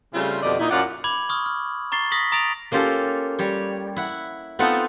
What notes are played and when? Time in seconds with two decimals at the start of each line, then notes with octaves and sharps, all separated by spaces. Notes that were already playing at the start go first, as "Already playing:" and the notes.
0.14 C#3 G3 A3 C4 F4
0.43 F2 B2 D3 G4 D5 D#5
0.59 A#2 D#4 E4
0.71 F#2 C#4 F4 D5 F#5
1.04 B5 D6 G#6 F#7
1.29 C#6 D#6 F6
1.46 F6
1.92 A#5 C#6 A6 C7 G7
2.11 D#6 A#6 B6 F#7
2.32 A#5 D#6 A6 A#6 D7 F7
2.72 A#3 C#4 F4 G4 A4
3.39 G3 C#5
3.96 E4 F#5
4.59 B3 C4 D#4 F4 A4 F#5